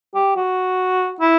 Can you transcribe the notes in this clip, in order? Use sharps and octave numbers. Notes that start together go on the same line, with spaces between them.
G4
F#4
E4